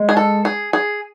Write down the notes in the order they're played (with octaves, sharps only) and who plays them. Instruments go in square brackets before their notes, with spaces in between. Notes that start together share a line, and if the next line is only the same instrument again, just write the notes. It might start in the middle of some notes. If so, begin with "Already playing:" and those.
Already playing: [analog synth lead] G#3
[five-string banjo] G#4
A4
G#4
G#4